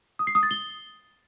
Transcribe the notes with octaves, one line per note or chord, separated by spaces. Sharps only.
D#6
C7
D#6
A6
G7